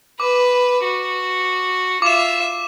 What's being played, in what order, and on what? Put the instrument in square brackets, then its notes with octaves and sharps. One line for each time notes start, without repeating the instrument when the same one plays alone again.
[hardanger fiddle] B4 [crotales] D6
[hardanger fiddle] F#4
[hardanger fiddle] F4 E5 [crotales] D6 E7